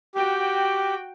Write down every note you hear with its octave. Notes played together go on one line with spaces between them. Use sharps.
F#4 G4 G5